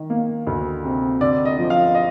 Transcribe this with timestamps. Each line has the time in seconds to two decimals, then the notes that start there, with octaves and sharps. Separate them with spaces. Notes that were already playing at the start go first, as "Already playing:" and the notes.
Already playing: D#3
0.10 A#3
0.47 D2
0.84 C3
1.21 D3 D5
1.45 D#5
1.58 F3
1.70 F5
1.95 D#5